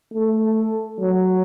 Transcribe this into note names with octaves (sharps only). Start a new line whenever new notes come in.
A3
F#3